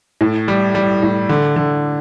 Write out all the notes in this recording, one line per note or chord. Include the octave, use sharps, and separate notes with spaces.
A2
G3
G3
A2
D3
D3